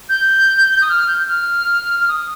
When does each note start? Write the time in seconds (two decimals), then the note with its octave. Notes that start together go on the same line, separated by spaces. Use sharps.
0.09 G6
0.81 D#6
0.89 F6
1.08 G6
1.28 F6
1.97 F6
2.08 D#6